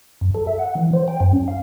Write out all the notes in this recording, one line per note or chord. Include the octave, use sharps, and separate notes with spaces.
F#2
A4
E5
F#5
E3
C5
G5
F#2
C#4
F5